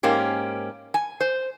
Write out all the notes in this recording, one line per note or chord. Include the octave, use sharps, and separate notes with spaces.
G#2 A#3 C#4 G4
G#5
C5